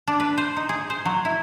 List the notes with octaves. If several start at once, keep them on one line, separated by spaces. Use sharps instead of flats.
D4
B4
C5
D#4
G#4
C5
F#3
E4